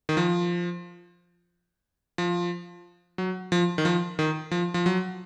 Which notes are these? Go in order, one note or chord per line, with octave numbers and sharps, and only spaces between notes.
D#3
F3
F3
F#3
F3
D#3
F3
D#3
F3
F3
F#3